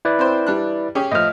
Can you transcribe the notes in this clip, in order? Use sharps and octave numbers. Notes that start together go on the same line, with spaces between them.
E4 B4 D5
C4 C5
G3 D4 F#6
C#4 G4 G#4
A2 F3 D#5 F6